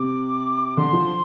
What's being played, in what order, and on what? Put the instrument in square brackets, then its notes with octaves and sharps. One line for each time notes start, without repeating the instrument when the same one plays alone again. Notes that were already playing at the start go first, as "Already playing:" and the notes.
Already playing: [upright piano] C3 [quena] D6
[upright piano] D3 [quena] C6
[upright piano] F3